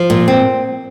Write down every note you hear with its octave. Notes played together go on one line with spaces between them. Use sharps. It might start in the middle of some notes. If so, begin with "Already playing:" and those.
Already playing: F3
A#2
C4